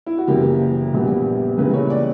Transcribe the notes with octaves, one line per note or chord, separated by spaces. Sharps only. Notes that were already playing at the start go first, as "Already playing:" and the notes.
E4
F#4
F#1 F#2 E3 A#3 G4
A#1 A#2 G3 B3
C#2 C#3 E3 G3 A#3 B4
C#5
D5